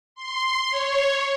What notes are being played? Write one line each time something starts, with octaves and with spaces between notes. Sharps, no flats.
C6
C#5